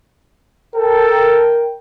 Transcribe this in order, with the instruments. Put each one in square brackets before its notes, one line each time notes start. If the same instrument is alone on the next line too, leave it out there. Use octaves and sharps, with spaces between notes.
[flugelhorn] A4 [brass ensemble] A#4 G5